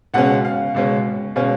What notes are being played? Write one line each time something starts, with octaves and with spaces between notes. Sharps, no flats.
C#2 B2 G#3 C#4 F#5
F5
C#2 B2 G#3 C#4
B2 G#3 C#4 F5